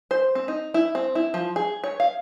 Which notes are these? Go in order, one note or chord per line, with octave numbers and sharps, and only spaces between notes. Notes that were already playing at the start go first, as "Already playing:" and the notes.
C5
C4
D#4
E4
C4
E4
F3
G#4
C#5
F5